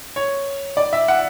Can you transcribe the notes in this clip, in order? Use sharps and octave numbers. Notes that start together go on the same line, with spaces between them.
C#5
D5
E5
F#5